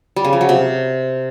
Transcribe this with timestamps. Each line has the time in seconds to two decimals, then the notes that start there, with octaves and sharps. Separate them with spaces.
0.16 G3
0.25 C#3
0.33 F3
0.41 F#3
0.49 C3